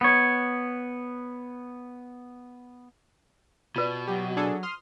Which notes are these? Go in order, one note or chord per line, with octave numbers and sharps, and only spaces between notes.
B3 C#5
B2 F4 B4 D5
F#3 G4
D4 G#4 A4
C6 D#6 F6